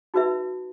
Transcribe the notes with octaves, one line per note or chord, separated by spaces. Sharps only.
D#4 F#4 B4 E5